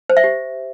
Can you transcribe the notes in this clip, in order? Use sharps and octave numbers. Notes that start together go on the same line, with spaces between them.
C5
E5
G4